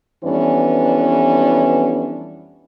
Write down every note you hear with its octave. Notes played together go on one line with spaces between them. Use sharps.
F2 E3 G3 B3 C#4 D4